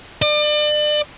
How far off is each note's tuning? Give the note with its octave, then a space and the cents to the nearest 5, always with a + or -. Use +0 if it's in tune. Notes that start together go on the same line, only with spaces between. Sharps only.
D5 +35